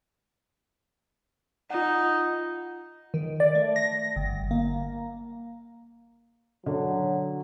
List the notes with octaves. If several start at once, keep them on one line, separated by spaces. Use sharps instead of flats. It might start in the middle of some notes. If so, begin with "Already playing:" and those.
D#4 F4 F#5
D#3
D5
A3
A#6
G1
A#3
D3 F#3